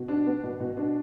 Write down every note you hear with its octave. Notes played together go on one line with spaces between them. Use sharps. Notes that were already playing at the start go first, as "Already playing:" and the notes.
Already playing: B2
D4
B3
B2
B2
D4